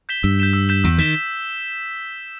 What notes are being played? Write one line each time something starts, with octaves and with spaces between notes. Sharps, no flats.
G6 B6 E7 G7
G2 E6
G6 B6 E7 G7
E6
G6 B6 E7 G7
E2 E6
D#3 G6 B6 E7 G7